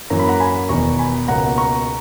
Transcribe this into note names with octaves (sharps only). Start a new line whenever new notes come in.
F#2 E3 A#3 A#5
B5
F#5 A#5
G#5 B5
E1 E2 D#3 A#5 C#6
G#5 B5
C#2 B2 A#3 F#5 A#5
A#5 C#6